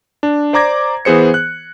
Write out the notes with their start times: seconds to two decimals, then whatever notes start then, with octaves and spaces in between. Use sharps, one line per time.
0.23 D4
0.53 C5 D5 A#5 D6 G#6 A#6
1.05 E3 B3 G#4 C5 C#7
1.34 F#6